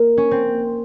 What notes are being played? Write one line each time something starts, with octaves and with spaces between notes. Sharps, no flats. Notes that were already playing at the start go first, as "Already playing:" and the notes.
Already playing: A#3
C#4
C4